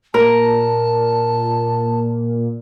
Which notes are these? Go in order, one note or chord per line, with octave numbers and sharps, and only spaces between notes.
A#2 A#4 A5